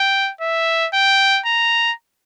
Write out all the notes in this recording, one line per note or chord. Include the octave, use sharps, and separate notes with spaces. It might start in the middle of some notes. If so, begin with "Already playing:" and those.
Already playing: G5
E5
G5
A#5